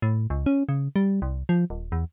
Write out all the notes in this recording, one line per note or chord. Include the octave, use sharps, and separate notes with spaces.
A2
C#2
C#4
C#3
G3
C2
F3
D#1
E2